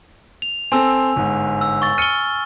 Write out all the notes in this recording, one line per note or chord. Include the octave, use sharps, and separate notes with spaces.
F7
C4 A4 G#5 E6
G1 G#2
E6
C#6 A6
F6 C#7 D#7 G7